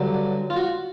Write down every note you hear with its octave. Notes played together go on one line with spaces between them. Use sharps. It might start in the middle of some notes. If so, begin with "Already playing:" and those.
Already playing: G2 D3 F#3
F4
F#4